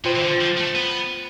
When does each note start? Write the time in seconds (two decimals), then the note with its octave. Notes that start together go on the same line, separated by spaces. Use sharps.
0.05 B2 F4 C5 G5 C6
0.15 E3
0.23 D3
0.41 F3
0.57 A3
0.75 B3